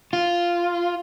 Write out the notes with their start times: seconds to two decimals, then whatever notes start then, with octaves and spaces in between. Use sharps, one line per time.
0.13 F4